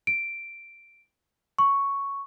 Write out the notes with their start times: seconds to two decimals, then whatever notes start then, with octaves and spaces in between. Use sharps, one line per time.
0.07 D7
1.59 C#6